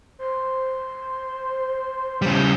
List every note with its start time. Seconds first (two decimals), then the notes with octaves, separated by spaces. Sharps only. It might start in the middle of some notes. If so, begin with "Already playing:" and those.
0.19 C5
2.22 C#3 G3 G6